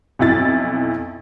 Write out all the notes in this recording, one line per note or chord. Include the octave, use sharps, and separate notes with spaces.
B1 F2 E4 A6